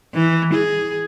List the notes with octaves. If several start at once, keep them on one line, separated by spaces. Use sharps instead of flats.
E3
G#4